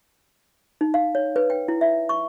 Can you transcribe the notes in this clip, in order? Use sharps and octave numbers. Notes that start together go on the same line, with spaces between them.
D#4
F5
C#5
B4
G5
E4
E5
C#6